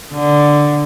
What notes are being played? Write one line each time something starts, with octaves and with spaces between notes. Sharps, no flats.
D3